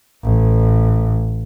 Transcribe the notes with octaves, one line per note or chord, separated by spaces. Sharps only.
A1